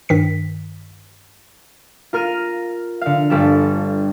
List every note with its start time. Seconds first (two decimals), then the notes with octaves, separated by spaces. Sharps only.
0.09 G2 D#3 B6
2.13 F4 A#4 F6 D#7
3.01 D3 F5
3.30 G1 G3 A4